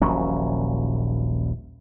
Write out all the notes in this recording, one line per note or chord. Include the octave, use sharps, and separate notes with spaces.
D#1 A#1 F#3 C#4